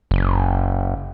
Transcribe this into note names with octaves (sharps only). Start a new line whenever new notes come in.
F#1